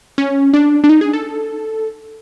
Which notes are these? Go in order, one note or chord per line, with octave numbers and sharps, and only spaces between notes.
C#4
D4
D4
D#4
G#4
A4